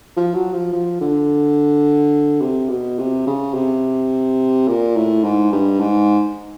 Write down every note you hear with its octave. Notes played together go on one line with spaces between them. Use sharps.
F3
F#3
F3
F3
D3
C3
B2
C3
C#3
C3
A#2
A2
G#2
G2
G#2